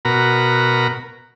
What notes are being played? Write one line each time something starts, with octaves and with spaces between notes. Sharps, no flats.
B2 F#4 A#4 A#5 B5